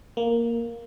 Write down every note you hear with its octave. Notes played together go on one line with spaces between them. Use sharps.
A#3